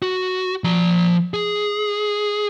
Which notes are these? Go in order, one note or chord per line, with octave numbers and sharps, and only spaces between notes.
F#4
F3 A#5
G#4